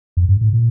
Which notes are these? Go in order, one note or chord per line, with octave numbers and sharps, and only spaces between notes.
F2
G2
A2
A#2